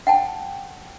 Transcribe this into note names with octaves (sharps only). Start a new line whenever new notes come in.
F#5 G5 A5